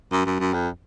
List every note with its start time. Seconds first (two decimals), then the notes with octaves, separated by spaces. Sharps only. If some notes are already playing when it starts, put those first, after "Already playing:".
0.12 F#2
0.26 F#2
0.40 F#2
0.54 F2